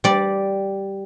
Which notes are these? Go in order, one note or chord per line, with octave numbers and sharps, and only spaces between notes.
G3 D5